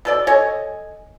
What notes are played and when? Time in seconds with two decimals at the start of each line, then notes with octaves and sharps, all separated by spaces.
0.05 B2 A4 D5
0.27 A4 C#5 D#5 G#5